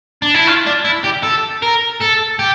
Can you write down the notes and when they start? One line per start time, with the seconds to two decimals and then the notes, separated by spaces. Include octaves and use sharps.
0.22 D4
0.35 E4
0.47 F4
0.66 D4
0.84 E4
1.04 G4
1.23 A4
1.62 A#4
2.00 A4
2.39 G4